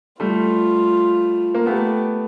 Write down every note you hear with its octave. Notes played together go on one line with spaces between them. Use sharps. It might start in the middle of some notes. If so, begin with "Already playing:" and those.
G3 A3 F4
A#3
A3 B3 G4